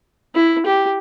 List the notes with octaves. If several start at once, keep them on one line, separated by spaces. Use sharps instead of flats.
E4
G4